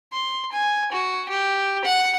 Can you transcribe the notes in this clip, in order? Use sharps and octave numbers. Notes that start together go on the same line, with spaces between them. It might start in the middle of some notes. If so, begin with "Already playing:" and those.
C6
G#5
F#4
G4
F#5